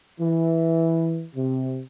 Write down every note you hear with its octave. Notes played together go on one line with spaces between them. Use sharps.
E3
C3